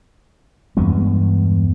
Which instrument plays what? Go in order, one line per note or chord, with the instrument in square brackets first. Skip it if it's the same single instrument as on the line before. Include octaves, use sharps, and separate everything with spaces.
[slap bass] E2 G2 G#3 B3